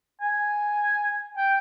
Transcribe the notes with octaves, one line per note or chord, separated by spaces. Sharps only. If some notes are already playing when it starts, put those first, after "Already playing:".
G#5
G5